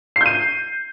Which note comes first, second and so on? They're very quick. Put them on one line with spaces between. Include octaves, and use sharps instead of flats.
C7 G6 D#7